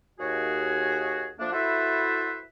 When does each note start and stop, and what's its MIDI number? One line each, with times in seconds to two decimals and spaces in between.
0.20 1.29 39
0.20 1.29 66
0.20 1.29 68
1.39 1.48 53
1.39 1.48 57
1.39 1.48 58
1.39 1.48 62
1.53 2.42 64
1.53 2.42 66
1.53 2.42 69
1.53 2.42 71
1.53 2.42 72
1.53 2.42 76